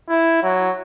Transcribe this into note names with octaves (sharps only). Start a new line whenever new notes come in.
E4
F#3